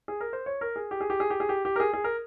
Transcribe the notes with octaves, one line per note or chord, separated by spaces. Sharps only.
G#4
A#4
C5
C#5
A#4
G#4
G4
G#4
G4
G#4
G4
G#4
G4
G4
A#4
G#4
G#4
A#4